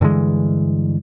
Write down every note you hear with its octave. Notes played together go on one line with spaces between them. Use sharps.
G2 D3 E3 G#3